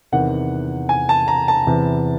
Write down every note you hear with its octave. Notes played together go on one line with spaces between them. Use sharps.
E2 C3 D#3 F#5
G#5
A5
A#5
A5
E2 C3 E3